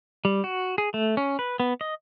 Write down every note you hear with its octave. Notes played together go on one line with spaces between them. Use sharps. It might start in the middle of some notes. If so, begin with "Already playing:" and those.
G3
F#4
G#4
A3
C#4
B4
B3
D#5